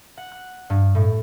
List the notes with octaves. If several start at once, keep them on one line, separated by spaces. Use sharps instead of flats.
F#5
F#6
G2
A2